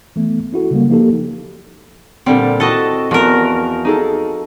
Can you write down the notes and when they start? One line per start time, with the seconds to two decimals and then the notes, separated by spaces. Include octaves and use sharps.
0.16 E3 A3 B3
0.53 C#4 E4 F#4 A4
0.71 C#3 G3 A#3
0.89 F3 A#3 D#4 G4 A4
2.26 A#2 D3 G3 C4
2.60 E4 F#4 A4 D#5 A5
3.11 E2 F3 F#4 A#4
3.85 D#4 G#4 A4